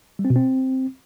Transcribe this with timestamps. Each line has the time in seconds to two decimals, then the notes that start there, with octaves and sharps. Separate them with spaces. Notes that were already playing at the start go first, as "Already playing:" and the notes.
0.19 G3
0.25 C4
0.30 B2
0.36 C4